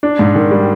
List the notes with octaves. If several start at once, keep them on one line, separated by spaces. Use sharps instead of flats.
D4
G#2
D#3
G3